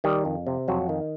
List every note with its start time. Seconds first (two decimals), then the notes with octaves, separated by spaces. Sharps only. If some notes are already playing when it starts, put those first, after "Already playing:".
0.04 D#3 G3 G4
0.25 F2
0.47 C3
0.68 F2 F#3 F#4
0.89 D#3